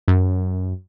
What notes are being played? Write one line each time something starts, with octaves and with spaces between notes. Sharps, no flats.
F#2